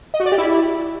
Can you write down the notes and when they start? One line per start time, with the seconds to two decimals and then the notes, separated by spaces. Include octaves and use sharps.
0.14 D#5
0.20 F#4
0.26 D5
0.32 G4
0.38 E4